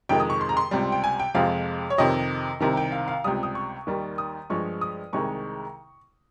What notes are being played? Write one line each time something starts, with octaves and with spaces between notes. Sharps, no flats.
F2 C3 D#3 G#3 G5
D#6
C#6
C6
A#5
C6
C#2 C3 G3
G5
G#5
G5
F2 C3 F3 G#3 F5
C#5
F2 C3 D#3 D#5
C2 C3 D#3 A#5
G5
F5
F5
C#2 C3 G3 D#6
D#6
C#6
D#2 D#3 G3
D#6
G2 F3 G#3 C#6
D#6
C2 C3 D#3 G#3 C#6